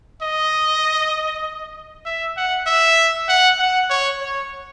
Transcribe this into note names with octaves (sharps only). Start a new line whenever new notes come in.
D#5
E5
F#5
E5
F#5
F#5
C#5
C#5